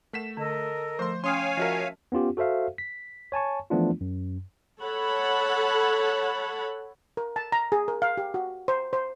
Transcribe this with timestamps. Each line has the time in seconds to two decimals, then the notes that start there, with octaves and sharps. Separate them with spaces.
0.13 A3 A#4 F#5 B6 E7
0.37 D3 A4 A#4 D#5
0.99 F3 A3 C5 C6
1.24 C#4 C#5 F5 G5 G#5 C6 D#6 F6
1.57 F3 F#4 A#4 D#5 E5 A5
2.12 B3 C#4 F4 G4
2.37 F#4 A4 C5 E5 F5
2.78 B6
3.32 C#5 G#5 A5 C#6
3.70 E3 F3 A3 B3 D4 F4
4.01 F#2
4.81 A4 C#5 F#5 A5 B5
7.17 A#4
7.36 A5
7.52 A#5
7.72 G#4
7.88 A#4
8.02 F5
8.17 G4
8.34 F#4
8.68 C5
8.93 C5